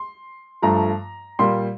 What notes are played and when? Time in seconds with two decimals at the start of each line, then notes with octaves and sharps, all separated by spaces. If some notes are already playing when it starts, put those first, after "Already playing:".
Already playing: C6
0.62 G2 F3 A3 A#5
1.39 A#2 G3 A#3 C6